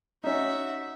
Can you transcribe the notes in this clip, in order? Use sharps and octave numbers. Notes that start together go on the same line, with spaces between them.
C#4 D#4 F#4 E5